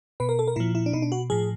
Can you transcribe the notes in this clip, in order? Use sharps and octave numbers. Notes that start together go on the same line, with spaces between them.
B2 B4
A#4
A4
A#4
A#2 F3 E4
E4
D4
B2 D#4
D4
F#4
A2 F3 G#4